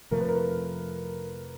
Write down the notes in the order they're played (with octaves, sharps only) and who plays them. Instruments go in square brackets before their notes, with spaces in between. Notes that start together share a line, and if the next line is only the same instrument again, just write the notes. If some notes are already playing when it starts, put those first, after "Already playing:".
[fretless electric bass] F2 C3 F3 A3 [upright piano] A#4
[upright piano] B4
A#4